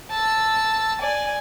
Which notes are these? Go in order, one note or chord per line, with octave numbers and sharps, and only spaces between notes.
A5 E6
D5 G#5